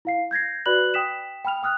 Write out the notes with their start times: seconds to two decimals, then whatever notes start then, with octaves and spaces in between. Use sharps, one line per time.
0.05 E4 F5 C7
0.31 G6 G#6 A#6 C7
0.66 F#4 B4 D5 B5 F#6 F#7
0.94 G5 D#6 B6 E7
1.44 G5 B5 F6 F7
1.63 G5 D#6 F6 F#6